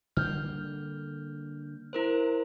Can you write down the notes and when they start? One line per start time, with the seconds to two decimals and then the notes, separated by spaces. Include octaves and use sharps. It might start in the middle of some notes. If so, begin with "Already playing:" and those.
0.17 D3 G3 A#3 F6 G6
1.93 E4 A#4 C5